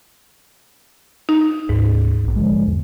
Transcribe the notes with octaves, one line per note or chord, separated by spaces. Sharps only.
D#4
D2 G#2
D1 B1
D3 F3 G#3
E2